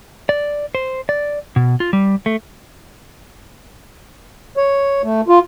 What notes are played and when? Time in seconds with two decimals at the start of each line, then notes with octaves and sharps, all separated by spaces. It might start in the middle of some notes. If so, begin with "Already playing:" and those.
0.29 D5
0.75 C5
1.09 D5
1.56 B2
1.80 F4
1.93 G3
2.26 A3
4.57 C#5
5.04 A3
5.28 F4